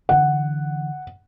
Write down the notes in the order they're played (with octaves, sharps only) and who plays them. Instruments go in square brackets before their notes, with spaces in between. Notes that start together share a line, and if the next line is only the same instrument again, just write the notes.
[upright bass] D3 E3 [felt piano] F#5